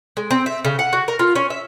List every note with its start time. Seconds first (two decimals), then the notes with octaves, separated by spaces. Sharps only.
0.17 G#3
0.31 C4
0.46 E5
0.65 C#3
0.79 F#5
0.93 F#4
1.08 A#4
1.19 F4
1.36 C#4
1.50 E5